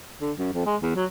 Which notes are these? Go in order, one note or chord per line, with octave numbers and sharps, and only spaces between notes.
D3
F#2
F2
G#3
E2
F#3